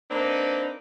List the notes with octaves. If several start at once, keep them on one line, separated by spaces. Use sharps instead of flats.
A#3 C4 D4 D#4 B4